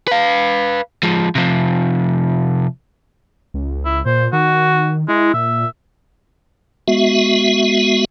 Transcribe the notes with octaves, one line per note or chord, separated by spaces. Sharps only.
B4 F5
F3 G#3
C3 F3
C#2
E4
A#2 C5
D#3 F#4
G#3 E4
A#2 E5
G#3 B3 F#4 E5